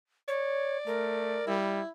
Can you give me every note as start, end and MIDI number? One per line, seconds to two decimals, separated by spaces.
0.28 0.78 73
0.28 1.45 74
0.86 1.41 57
0.86 1.55 70
1.47 1.81 55
1.47 1.89 64